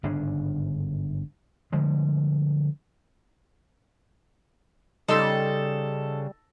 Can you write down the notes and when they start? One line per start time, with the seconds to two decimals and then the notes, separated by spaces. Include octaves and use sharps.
0.03 G1 G#2 C#3 D4
1.72 D3 F3 G3 G#3
5.08 C#3 G3 D#4 A4 C6 E6